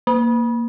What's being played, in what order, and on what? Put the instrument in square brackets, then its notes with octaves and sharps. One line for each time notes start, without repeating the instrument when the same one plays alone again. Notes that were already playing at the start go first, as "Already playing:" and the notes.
[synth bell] A#3